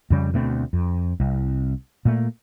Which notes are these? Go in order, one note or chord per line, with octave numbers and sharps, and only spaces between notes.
F2 C#3 G3
D2 B2 A3 C4
F2
C2
A#2 A3 A#3